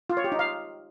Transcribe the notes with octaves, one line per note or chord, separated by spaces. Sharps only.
F4
C#5
G4
D#4
F5